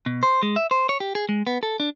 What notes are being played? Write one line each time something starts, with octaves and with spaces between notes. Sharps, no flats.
B2
C5
G#3
E5
C5
C#5
G4
G#4
G#3
B3
A4
D4